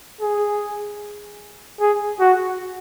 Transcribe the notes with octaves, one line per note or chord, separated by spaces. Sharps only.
G#4
G#4
F#4